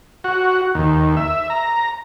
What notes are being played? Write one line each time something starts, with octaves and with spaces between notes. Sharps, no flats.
F#4
D#2
E5
A#5